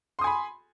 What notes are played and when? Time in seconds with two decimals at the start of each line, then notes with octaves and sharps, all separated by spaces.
0.19 C6
0.21 D#6
0.24 G#5
0.27 B5